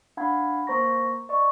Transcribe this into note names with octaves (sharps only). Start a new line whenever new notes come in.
D4 F5 F#5 B5 G#6
A#3 C5 A#5 C#6 A#6
D5 D#5 C#6